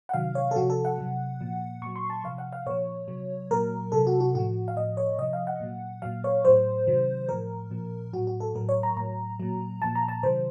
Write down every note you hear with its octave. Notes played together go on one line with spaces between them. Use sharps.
F#5
C3 D#3 F#3 F5
C#5
A4
C3 F3 F#4
A4
F#5
C3 F#3
A#2 F3
A#2 F#3 C#6
C6
A5
C3 F3 F5
F#5
F5
A#2 F3 C#5
C3 F#3
A#2 F#3 A#4
C3 F#3 A4
F#4
F#4
A2 F3 F#4
F5
A2 F3 D#5
C#5
C3 F3 D#5
F5
F#5
A#2 F#3
A#2 F#3 F5
C#5
A2 F#3 C5
C3 D#3 F#3
A2 F3 A#4
A#2 F3
A2 F#3 F#4
F#4
A4
A2 F#3 A#4
C#5
A#5
A2 F#3 A#5
A#2 F#3
A#2 F3 A5
A#5
A5
C3 D#3 F#3 C5